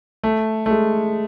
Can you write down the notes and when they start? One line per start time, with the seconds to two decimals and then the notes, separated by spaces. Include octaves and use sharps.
0.24 A3
0.66 A3
0.71 G#3